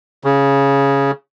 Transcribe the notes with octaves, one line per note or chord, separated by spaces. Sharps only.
C#3